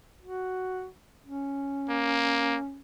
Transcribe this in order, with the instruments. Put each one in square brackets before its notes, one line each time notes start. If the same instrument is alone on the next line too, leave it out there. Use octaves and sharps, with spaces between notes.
[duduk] F#4
C#4
[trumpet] A#3